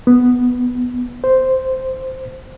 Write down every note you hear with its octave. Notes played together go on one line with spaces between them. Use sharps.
B3
C5